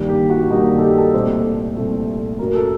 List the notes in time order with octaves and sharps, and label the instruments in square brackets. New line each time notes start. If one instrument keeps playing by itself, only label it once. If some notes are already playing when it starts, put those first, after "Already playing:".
Already playing: [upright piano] G2 D#3 G3 A#3
G4
F#4
G2 D#3 G3 A#3 D#4
A4
G4
A4
C2 A#2 A3 C5
C2 A#2 A3
F#2 F#3 A3 A#4
A4